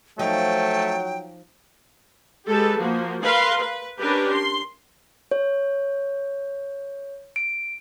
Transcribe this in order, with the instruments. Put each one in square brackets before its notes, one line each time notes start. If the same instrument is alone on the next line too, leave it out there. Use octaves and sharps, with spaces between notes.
[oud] F3 D#4 [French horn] F#3 [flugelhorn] A3 [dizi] G5
[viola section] G#3 G4 A4 B4
F3 A#3 F#4
A#4 B4 F5 C6
B4
C#4 D4 G4 A#4 B4
C6
[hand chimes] C#5
D7